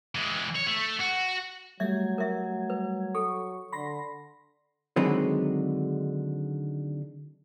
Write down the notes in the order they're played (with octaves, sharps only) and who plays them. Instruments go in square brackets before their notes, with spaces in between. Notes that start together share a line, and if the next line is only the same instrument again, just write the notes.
[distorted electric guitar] E3 G#3
C#5
A3
F#4
[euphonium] F#3 [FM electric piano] G3 A3 G#6 [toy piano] E5
[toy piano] A#4 E5
B4
[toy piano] A4 [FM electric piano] C#6
[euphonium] D3 [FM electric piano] B5 C6 A#6
[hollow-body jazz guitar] D3 D#3 F#3 G#3 C4 B4